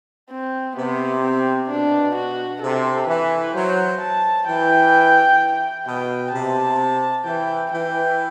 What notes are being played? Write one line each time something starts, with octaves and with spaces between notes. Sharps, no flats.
C4
C3 B3
C4
B2 D4
F#4
C3 A4
E3 B4
F#3 C5
A5
E3 G5
B2 G5
C3 A5
E3 G5
E3 G5